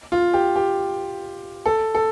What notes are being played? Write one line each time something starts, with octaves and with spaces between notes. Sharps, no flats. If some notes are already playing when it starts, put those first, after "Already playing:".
F4
G4
G4
A4
A4